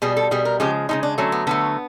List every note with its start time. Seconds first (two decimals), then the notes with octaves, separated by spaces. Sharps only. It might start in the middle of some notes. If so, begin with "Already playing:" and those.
0.02 B2 G3 G#4
0.17 A4
0.31 B2 G3 G#4
0.45 A#4
0.60 C#3 F3 G#3 G4
0.89 C#3 F3 G#3 D#4
1.03 D4
1.18 D3 F#3 A3 C#4
1.32 B3
1.47 D3 F#3 A3 B3